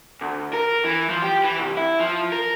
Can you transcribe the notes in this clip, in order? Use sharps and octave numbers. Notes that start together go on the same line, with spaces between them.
D2
A#4
E3
F3
G4
E3
C2
E4
F3
A#4